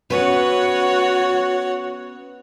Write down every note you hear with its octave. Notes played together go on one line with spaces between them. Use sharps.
B3 C#4 F#4 B4 C#5 F#5